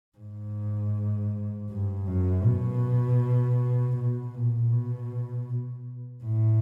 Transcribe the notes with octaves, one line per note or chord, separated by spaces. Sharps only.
G#2
G2
F#2
B2
B2
A#2
B2
A2